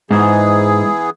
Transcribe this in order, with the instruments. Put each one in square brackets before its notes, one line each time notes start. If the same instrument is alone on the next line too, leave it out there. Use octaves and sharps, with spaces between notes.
[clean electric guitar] G#2 [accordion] E3 B3 G#4